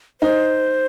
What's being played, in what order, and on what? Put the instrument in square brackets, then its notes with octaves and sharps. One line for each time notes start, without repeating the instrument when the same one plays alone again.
[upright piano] D#4 [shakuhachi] C5